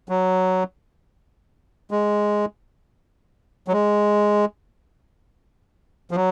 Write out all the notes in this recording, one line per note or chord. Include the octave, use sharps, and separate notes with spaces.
F#3
G#3
F#3
G#3
F3
F#3